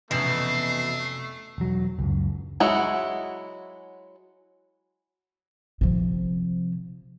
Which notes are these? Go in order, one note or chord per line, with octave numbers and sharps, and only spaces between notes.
F1 B2 E3 A3 C#4 G6 C7
E1 F#3
C#2 F#2
F#3 G#3 E4 F#4
C3 F3